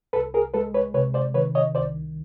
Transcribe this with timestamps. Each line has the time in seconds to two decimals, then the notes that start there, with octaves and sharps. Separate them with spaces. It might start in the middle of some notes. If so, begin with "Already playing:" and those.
0.13 C2 A4 B4
0.34 G#4 A#4
0.54 G#3 A4 B4
0.74 B4 C#5
0.94 C3 B4 C#5
1.14 C5 D5
1.34 D#3 B4 C#5
1.55 C#5 D#5
1.75 C2 C5 D5